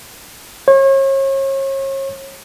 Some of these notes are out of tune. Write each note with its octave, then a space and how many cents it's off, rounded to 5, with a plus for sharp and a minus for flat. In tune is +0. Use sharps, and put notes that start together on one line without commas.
C#5 -35